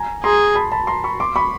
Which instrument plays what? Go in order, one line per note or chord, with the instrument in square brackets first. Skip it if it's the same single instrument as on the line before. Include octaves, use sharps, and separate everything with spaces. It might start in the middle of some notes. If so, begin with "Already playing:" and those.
Already playing: [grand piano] G#5 A#5
[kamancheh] G#4 [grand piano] A#5 C6
[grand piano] A5 B5
A5 B5
A#5 C6
B5 C#6
C6 D6
B5 C#6